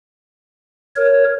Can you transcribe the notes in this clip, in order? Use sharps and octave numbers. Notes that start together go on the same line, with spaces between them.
A#4 C#5